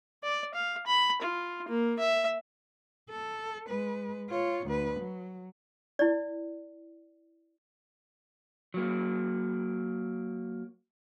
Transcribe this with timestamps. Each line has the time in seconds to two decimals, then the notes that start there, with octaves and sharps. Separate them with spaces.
0.23 D5
0.54 F5
0.87 B5
1.22 F4
1.69 A#3
1.99 E5
3.10 A4
3.67 G#3 B4
4.29 F4 C#5
4.66 D2 B4
5.00 F#3
5.99 E4 D5
8.74 F#3 A#3